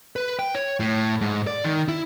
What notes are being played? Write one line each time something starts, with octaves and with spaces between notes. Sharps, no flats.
B4
G5
C#5
A2
G#2
D5
D#3
E4